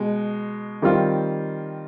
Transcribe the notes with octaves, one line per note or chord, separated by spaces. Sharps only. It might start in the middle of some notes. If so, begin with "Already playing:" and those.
Already playing: B2 G#3
D#3 G3 C4 F4